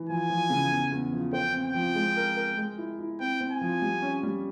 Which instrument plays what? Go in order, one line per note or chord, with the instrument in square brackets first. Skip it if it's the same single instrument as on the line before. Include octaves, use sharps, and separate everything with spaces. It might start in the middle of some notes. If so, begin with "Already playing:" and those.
Already playing: [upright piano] E3
[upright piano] F3 [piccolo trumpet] G#5
[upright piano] F3
C#3
E2
E2
F3
[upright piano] C5 [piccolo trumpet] G5
[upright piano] C4
[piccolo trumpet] G5
[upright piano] F3
G#3
A#4
A#4
G#3
E4
E4
[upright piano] C4 [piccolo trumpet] G5
[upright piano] C4
[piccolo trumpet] G#5
[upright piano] F3
G3
C#4
G3